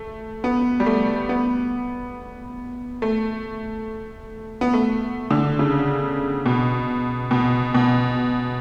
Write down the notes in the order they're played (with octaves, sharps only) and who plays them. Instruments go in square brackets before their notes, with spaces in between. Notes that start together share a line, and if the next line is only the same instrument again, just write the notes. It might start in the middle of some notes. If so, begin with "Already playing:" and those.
Already playing: [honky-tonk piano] A3
B3
G3
A3
B3
A3
B3
A3
D3
C#3
B2
B2
B2